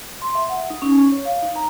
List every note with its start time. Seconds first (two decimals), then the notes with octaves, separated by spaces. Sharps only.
0.22 C6
0.35 E5
0.49 F#5
0.70 D#4
0.82 C#4
0.98 C#6
1.12 C#5
1.25 F5
1.43 D#4
1.56 A#5